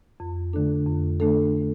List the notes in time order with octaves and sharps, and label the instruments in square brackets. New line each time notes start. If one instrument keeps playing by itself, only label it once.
[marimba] F2
D3 A3 D4 A4
F2
D3 A3 D4 A4